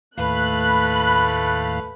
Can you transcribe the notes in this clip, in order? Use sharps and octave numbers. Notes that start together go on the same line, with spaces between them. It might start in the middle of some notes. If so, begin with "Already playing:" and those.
D#2 A2 A3 B4 F5 B5 F#6